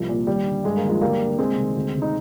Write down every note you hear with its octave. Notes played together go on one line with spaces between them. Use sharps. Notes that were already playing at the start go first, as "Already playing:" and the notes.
Already playing: C2 F3
A#2
D#2 G3
D3
G2 G#3
A#3
D#3
F3 G#3
D2 G3 A#3
D3
C2 G#3 C4
C3 D#3
D2
C3 D#3
D#4